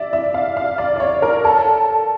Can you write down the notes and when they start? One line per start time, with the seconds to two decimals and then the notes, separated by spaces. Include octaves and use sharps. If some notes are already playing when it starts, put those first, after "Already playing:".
Already playing: D5 E5
0.13 E5
0.34 F5
0.57 F5
0.78 D5
0.96 D5
1.00 C#5
1.22 A#4
1.45 A4